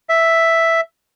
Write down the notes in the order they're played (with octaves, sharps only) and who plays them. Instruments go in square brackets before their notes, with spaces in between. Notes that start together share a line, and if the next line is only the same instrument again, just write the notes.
[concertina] E5